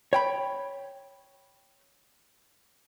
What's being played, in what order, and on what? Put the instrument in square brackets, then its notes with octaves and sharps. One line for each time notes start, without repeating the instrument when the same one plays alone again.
[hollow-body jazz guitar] C#5 G5 B5